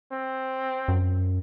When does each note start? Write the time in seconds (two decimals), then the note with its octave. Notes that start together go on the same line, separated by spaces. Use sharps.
0.12 C4
0.88 F#2